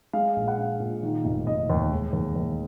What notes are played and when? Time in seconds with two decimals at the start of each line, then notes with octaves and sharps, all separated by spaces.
0.13 G#3 F5
0.36 A#1
0.48 F#5
0.58 D4 F5
0.80 A#2
1.03 D#3
1.25 F1
1.46 F1 D#5
1.70 D#2
1.92 G#3
2.13 D#2
2.36 D#2